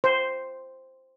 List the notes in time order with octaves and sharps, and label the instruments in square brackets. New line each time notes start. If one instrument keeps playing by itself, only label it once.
[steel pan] C5